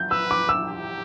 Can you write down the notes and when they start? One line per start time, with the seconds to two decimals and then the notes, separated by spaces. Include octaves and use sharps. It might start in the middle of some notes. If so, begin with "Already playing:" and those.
Already playing: G6
0.11 B4 E6
0.31 D6
0.49 E6
0.68 G4